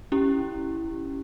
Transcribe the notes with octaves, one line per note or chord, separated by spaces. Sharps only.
C#4 E4 G4